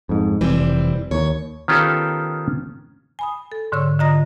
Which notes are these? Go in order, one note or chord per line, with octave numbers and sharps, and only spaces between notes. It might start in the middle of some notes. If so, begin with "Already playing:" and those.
F2 G#2
F1 E3 G3 C4
D#2 C#5
D#3 B3 C#4 F4 G4 A4
G#5 B5 D#6
A4
G#2 D3 C#5 C#6 E6
D3 F4 D#5 A#5 D#6 A#6